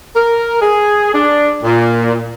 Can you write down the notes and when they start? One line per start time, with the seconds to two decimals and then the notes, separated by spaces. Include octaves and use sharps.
0.16 A#4
0.61 G#4
1.14 D4
1.63 A#2